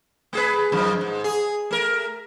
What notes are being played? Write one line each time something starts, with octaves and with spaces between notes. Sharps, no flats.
A3 G#4 B4
F#2 D#3 F3
G#2
G#4
A3 A#4